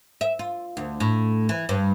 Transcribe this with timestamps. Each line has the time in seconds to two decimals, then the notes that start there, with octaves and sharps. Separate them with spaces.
0.21 E5
0.39 F4
0.77 D2
1.00 A2
1.49 E3
1.69 G2